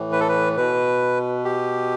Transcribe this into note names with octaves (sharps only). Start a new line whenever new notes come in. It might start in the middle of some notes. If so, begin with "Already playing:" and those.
Already playing: A2 E3
B4
A4
B4
B2 B4
G4